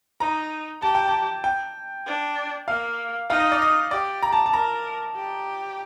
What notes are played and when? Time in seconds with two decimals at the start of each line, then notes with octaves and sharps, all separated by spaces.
0.20 D#4 A#5
0.82 G4 A5
0.95 G5
1.08 A5
1.44 G5
2.06 D4
2.68 A#3 F5
3.30 D#4 F5
3.40 D#5
3.52 D5
3.62 D#5
3.91 G4 D5
4.23 A#5
4.32 A5
4.46 A5
4.53 A#4 A#5
5.16 G4